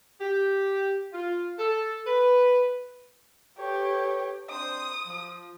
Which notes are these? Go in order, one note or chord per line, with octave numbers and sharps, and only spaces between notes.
G4
F4
A4
B4
G4 A4 B4 C#5
C4 D4 C5 D#6
F3